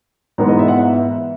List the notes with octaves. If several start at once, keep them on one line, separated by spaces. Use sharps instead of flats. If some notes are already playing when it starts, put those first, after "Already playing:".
G#2 E3 G#3 B3 A#5
D#5
E5
F#5
E5